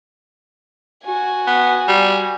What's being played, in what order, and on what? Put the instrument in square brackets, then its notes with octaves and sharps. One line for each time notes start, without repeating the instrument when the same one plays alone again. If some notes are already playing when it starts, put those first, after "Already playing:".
[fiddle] F#4 G#5
[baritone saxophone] B3
G3